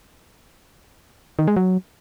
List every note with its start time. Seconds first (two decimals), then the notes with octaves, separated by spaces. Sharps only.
1.39 D#3
1.48 G#3
1.57 F#3